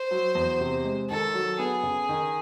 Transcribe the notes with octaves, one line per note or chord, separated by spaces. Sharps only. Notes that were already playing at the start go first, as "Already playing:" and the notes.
Already playing: C5
F#3
E2
C3
G#3
D#3 A4
F#3
B3 G#4
C#3
D#3